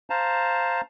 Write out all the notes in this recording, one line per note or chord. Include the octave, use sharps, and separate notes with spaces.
C5 F5 A5 A#5